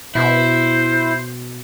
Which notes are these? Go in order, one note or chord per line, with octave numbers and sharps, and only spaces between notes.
B2 E4 C5